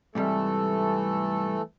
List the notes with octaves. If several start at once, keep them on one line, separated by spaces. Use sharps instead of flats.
G#2 C3 E3 G3 A3 A4